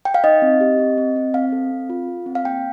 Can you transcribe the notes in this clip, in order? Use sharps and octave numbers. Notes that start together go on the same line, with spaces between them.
G5
F5
D#4 D#5
C4
G4
C4
C4
C4
C4 F5
A4
C4
F4
A4
C4
F5
A#3 G5